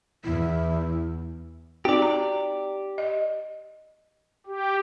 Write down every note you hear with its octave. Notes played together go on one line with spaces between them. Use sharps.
E2 E4
C4 D#4 F#4 G4 D5
A#5
D#5
G4